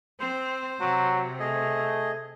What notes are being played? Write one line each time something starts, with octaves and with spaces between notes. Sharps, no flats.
C4 C5
C3 F#3
A3 G#4 D#5